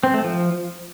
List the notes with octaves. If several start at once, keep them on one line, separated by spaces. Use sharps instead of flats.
C4
A3
F3